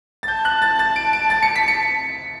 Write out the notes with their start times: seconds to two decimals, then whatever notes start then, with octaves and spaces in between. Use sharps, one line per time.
0.23 A6
0.28 A5 G6
0.45 F#6
0.62 A6
0.79 A6
0.96 D7
1.13 D7
1.30 A6
1.43 C#7
1.56 B6
1.68 C#7